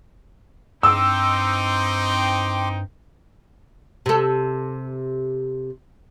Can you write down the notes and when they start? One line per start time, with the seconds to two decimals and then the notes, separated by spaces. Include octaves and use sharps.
0.83 G2 C4 D#4 G5 C6 D6 E6
4.06 C3 A4